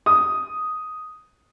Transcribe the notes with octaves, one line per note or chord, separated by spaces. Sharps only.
D#6